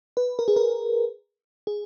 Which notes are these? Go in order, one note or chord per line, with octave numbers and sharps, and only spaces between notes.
B4
A#4
G#4
A#4
G#4